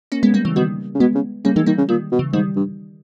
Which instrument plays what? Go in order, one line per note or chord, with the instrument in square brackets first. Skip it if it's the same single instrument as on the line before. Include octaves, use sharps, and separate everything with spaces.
[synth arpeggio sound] A#3 C#4
G#3 B3
G3 A#3
C#3 E3
[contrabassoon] B2 [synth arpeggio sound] D#3 G3
[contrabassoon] C#3
[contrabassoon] B2 [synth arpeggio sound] G#3 B3
[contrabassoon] C#3
[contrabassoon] C#3 [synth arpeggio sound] G3 A#3
[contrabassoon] D#3 [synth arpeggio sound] E3 G#3
[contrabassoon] D#3 [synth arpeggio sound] G3 A#3
[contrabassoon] C#3
[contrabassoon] A#2 [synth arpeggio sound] D#3 G3
[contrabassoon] B2
[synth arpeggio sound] C#3 E3
[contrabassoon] G#2 [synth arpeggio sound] D#3 G3
[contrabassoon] G2